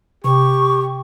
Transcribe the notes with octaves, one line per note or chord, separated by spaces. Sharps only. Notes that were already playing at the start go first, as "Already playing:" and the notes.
C3 G4 C#6